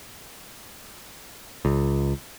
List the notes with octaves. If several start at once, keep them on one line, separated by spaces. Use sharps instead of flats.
C#2